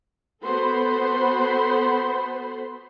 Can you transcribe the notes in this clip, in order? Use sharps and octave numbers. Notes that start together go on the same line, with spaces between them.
B3 F#4 A4 C5 B5 C6